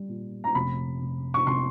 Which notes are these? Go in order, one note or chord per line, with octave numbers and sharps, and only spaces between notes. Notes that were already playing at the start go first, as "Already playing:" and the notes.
Already playing: G3
A#2
A#5
F1 B5
F1
C#6
C3 C6